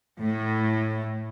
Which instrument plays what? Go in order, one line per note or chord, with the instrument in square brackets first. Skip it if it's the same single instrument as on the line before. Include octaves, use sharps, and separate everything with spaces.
[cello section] A2